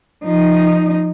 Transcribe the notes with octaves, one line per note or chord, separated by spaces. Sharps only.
F3 D#4